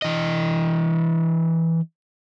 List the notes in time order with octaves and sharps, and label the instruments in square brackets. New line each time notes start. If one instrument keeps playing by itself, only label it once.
[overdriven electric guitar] E3 D#5